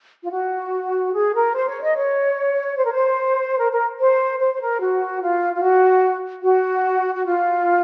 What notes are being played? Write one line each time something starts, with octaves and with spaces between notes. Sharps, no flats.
F4
F#4
G#4
A#4
C5
C#5
D#5
C#5
C5
A#4
C5
A#4
A#4
C5
C5
C5
A#4
F#4
F4
F4
F#4
F#4
F#4
F4